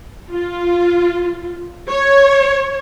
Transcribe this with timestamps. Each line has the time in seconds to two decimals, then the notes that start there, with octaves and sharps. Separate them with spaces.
0.32 F4
1.90 C#5